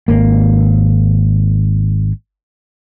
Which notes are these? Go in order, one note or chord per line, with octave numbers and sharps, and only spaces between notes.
G#1 A#3